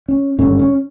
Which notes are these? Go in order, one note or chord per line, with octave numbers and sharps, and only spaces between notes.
C#4
G#1 G2 D3 C#4
C#4